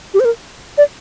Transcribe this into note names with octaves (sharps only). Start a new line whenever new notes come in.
G4
C5
A#4
D5